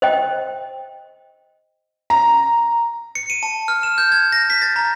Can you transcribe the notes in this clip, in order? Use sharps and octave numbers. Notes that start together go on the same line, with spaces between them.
C5 D#5 G5
A#5
C#7
D#7
A5
F6
E7
G6
G#6
A#6
B6
A6
A#5